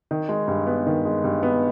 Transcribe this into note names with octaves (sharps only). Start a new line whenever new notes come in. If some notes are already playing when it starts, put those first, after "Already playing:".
D#3
G#3
G2
B3
D#3
G#3
G2
B3